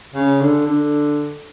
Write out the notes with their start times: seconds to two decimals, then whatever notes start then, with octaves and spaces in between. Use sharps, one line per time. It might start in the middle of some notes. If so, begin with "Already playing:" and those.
0.14 C#3
0.41 D3
0.66 D3